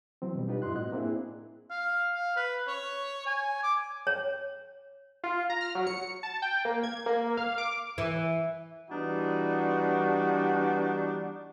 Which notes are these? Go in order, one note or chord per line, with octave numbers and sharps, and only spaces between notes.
E3 F#3 C4
B2 G3
D4 D#4 F4 G4 B4
G2 D#4 E4 C6 F#6
A2 C4 F#4 D#5 F#6
A#3 C4 D4 E4 G#4
F5
F5
B4
C#5
G#5
D6
C#5
F4
A#5
F6
F#3
C#7
A5
G5
A#3
G#6
A#3
F5
D6
E3
E3 G3 B3 D4 D#4 F#4